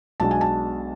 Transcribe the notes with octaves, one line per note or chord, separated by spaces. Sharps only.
B1 B2 G#3 D4 A5
G#5
A5